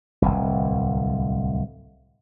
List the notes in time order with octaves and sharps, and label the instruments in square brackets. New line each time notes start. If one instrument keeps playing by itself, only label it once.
[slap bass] D1 G1 C2